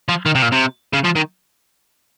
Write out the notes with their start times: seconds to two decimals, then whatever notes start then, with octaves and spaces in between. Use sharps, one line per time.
0.09 F3
0.26 D#3
0.35 C3
0.42 A#2
0.52 C3
0.93 C#3
1.04 F3
1.15 D#3